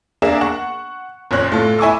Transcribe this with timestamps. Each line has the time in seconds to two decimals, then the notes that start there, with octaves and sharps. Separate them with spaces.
0.22 A#3 D4 G#4 A#4 E5 E7
0.41 F#5 C#6
1.31 F#1 A#2 C#5 F#6
1.52 A2 F4 A4
1.79 E4 G#5 C#6 D6 E6